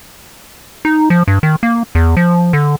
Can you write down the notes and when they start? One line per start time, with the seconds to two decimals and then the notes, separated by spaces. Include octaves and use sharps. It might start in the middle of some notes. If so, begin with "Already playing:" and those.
0.85 D#4
1.10 F3
1.28 G2
1.43 D#3
1.63 A#3
1.95 E2
2.17 F3
2.53 D3